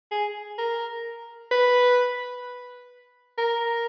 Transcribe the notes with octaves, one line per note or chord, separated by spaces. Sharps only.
G#4
A#4
B4
A#4